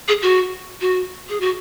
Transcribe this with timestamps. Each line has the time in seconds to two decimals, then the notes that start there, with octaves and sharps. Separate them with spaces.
0.08 G#4
0.22 F#4
0.81 F#4
1.29 G#4
1.40 F#4